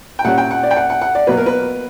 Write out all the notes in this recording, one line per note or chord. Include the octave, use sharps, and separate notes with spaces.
G5
A#2 G3 C#4 F#5
G5
F#5
D5
G5
F#5
F#5
F#5
D5
B2 F#3 A#3 B4
A#4
B4